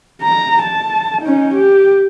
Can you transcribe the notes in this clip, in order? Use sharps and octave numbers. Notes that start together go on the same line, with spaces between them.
A#5
A5
C#4 D#4
G4